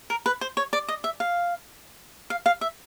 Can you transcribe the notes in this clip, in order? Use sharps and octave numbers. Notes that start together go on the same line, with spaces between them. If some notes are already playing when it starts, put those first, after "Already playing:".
A#4
B4
C5
C#5
D5
D#5
E5
F5
F5
F5
E5